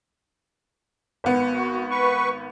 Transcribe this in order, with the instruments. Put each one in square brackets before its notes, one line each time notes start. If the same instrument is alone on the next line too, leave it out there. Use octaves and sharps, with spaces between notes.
[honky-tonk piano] G#1 B3 C#7
[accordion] F#4
B4 C#6